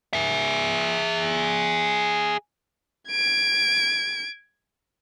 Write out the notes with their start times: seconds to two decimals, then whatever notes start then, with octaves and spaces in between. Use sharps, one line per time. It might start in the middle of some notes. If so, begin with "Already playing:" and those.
0.13 G#4 E5
3.10 G#6 D7